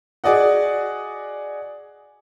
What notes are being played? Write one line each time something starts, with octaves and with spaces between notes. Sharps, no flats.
F#4 G#4 D5 D#5 F#5